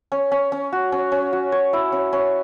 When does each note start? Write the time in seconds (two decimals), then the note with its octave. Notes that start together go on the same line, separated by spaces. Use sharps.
0.12 C#4
0.32 C#4
0.52 C#4
0.72 F#4
0.92 C#4
1.12 C#4
1.33 F#4
1.52 C#5
1.73 E4
1.92 C#4
2.13 C#4